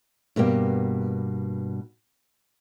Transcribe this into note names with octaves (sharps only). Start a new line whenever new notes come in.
G2 B2 A#3 G4